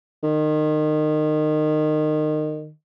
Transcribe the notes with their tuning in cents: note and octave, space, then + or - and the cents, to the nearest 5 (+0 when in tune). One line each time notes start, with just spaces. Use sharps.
D#3 -25